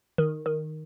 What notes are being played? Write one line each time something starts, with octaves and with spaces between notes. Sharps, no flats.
D#3
D#3